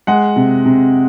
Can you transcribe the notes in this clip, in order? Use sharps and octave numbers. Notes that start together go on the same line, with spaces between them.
G#3 F#5
C3
C3